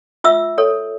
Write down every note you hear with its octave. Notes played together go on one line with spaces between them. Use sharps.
F4 E5 E6
A4 C#5